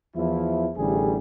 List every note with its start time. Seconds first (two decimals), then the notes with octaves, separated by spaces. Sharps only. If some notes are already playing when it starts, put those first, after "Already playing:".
0.16 E2 F3 E4
0.77 A1 D3 G3 G#4